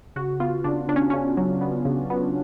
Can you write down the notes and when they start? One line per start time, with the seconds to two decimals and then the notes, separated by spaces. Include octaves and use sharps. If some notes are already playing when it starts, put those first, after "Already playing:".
0.16 C#3 F#4
0.40 B3 F4
0.64 C#3 D4
0.88 C#3 D4
0.96 C#4
1.10 C#3 C#4
1.37 F#3
1.61 B3
1.85 C#3
2.10 B3